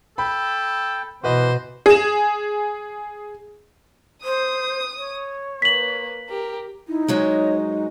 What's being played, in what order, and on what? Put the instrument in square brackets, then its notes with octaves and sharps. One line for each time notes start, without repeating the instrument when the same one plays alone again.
[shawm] A4 [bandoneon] G5 [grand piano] B5
[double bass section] B2 [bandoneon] E3 [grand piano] F#4 B4 D#5 [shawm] C5
[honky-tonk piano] G#4 E7
[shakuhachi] C5 [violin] D#6
[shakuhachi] C#5
[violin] A#3 B4 [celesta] B6 F#7
[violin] G4 A#4
[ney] D#4 [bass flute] E4
[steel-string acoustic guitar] G#2 F#3 G#3 [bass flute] C#5